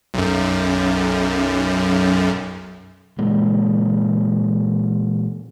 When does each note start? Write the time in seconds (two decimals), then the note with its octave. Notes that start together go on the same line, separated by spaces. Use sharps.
0.14 B1 F#2
3.18 A#2 E3 G#3 A#3